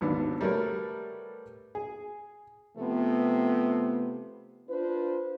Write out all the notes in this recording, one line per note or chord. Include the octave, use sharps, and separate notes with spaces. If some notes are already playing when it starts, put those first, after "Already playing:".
G#1 D#2 B3 D4
G3 A3 F#4 A#4 B4 C#5
G#4
C3 F3 A3 B3
D4 F4 B4 C5